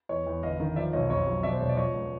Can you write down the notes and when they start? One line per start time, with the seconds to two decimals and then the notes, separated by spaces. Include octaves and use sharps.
0.09 E2 C#5 D#5
0.26 E2
0.43 G1 D#5 F5
0.60 D#3
0.76 F3 D5 E5
0.93 B1 C#5 D#5
1.10 F2 C#5 D#5
1.27 F#3
1.43 B2 D5 E5
1.53 C5
1.60 E1 C#5
1.69 D5
1.77 F3 C#5 D#5
1.94 C#2